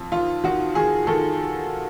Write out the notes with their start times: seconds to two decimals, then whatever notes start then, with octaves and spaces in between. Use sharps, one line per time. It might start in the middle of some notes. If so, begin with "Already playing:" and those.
Already playing: F2
0.12 D#3 F4
0.44 D#3 F#4
0.75 D#3 G#4
1.07 D#3 A4